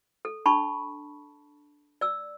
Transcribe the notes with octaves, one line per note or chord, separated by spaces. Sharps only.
A4
D4 A5 B5 C#6
D5 E6